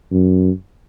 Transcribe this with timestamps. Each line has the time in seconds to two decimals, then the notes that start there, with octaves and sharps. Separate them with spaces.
0.12 F#2